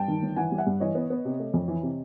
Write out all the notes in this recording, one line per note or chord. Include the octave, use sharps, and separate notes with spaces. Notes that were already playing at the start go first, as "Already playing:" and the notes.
Already playing: G2 G5 A5
D#3
G1
E3 F#5 G#5
G3
E5 F#5
G2
E3 C#5 D#5
B3
B3
C3
A3
F2
E3
C3